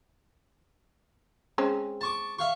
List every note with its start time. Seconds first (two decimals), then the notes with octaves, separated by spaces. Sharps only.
1.58 G#3 C4 C#4
2.01 A5 C#6 D6
2.39 E5 F5 C#6